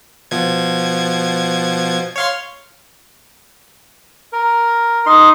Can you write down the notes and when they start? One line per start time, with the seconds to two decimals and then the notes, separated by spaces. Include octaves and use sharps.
0.31 B2 F3 G#6
2.16 C#5 F5 C6
4.33 A#4
5.06 D#4 C6